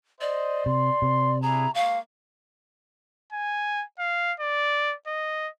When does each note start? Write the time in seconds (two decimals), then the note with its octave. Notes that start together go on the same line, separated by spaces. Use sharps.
0.21 C5 D5 D#5
0.66 C3 C6
1.02 C3
1.42 D4 E4 G#4 A#5
1.75 G#3 A#3 F5 C#6
3.33 G#5
3.99 F5
4.40 D5
5.07 D#5